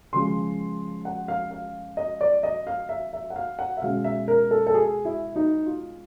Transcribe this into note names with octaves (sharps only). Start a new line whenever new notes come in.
C#3 F3 G#3 C6
F#5
F5
F5
D#5
D5
D#5
F5
E5
E5
F#5
F5
F#5
E5
B2 G#3 C#4 F5
E5
A#4
A4
A4
G#4
E4
D#4
F4